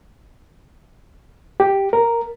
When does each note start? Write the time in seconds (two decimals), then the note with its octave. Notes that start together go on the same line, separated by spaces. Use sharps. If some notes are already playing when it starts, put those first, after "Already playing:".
1.60 G4
1.93 A#4